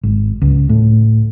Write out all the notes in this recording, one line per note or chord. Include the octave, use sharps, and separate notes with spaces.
G#1
C#2
A2